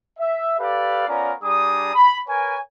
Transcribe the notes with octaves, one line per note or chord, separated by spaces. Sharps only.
E5
G4 A4 B4 D5 F5
B3 C#4 F4 A#4 D5 A#5
G3 D4 G#4 A#5 D#6
B5
A#4 B4 C#5 G#5